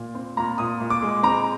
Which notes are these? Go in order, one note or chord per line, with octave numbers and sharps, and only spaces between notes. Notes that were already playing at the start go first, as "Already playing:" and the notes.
Already playing: A#2
C4
A#2 A#5
A#2 D#6
A#2
D6
G#3
C4 A#5